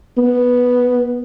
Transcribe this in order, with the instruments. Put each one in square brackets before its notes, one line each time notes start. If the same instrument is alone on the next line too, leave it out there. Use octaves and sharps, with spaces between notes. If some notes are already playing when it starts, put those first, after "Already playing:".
[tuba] B3